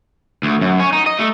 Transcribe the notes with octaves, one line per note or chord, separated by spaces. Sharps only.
D2
F#2
C#4
D#4
D#5
A3